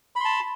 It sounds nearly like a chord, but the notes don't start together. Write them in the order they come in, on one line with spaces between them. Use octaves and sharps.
B5 C6 A5